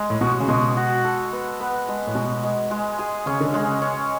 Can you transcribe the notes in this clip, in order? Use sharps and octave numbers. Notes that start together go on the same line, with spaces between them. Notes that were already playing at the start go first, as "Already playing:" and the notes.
Already playing: G#3
A2
B2 F#4
C#3
B2 G#3
F#4
A4
B3
B3
G#3
A2
B2 G#3
G#3
G#3
G#4
C#3 C#4
D3
C#3 G#3
C#4